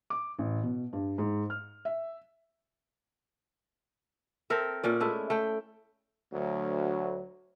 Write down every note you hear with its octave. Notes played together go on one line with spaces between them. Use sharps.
D6
A1
B2
G2
G#2
F6
E5
C4 A4 A#4 E5
A#2 C#4 D5
G#3 A3 E4
A3 G5
D2 F#3